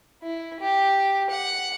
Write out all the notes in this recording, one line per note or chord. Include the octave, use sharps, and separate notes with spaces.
E4
G4
F#5